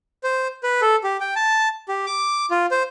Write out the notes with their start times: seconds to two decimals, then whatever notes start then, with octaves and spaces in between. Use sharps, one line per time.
0.23 C5
0.63 B4
0.81 A4
1.04 G4
1.20 G5
1.36 A5
1.88 G4
2.06 D6
2.51 F4
2.71 C5